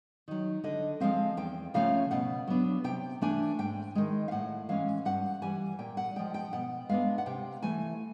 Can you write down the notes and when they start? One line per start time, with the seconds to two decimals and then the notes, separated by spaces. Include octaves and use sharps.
0.28 D#3 F#3
0.64 D3 D#5
1.00 F3 G#3 C4 F5
1.37 E2 G5
1.74 C#3 F3 A3 C#4 F5
2.11 B2 F#5
2.47 F#3 B3 D4
2.84 C3 G5
3.21 E3 A3 D4 G#5
3.59 G#2 G5
3.95 D#3 G#3
4.28 F5
4.31 A2 F#5
4.69 E3 G#3 C#4 F5
5.05 G2 F#5
5.42 E3 G3 G#5
5.79 A#2 G5
5.97 F#5
6.16 F3 G#3 G5
6.34 G5
6.53 B2 F#5
6.89 G#3 B3 D4 F5
7.18 F#5
7.26 C3 G5
7.62 E3 A3 G#5